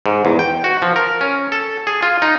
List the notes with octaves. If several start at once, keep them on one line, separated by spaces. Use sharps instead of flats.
G#2
E2
G5
F#4
F3
A#4
C#4
A4
G#4
F4
D#4